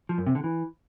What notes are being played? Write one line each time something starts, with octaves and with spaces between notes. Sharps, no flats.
F3
F#2
C3
D3
E3